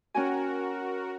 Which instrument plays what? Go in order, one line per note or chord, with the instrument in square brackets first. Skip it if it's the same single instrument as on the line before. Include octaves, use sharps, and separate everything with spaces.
[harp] C#4 G5 G#5 [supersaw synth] F#4 A#4